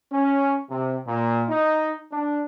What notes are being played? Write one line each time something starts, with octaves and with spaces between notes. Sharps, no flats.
C#4
C3
A#2
D#4
D4